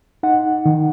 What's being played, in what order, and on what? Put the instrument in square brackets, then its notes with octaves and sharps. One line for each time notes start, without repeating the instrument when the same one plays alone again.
[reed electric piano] D#4 F#5
D#3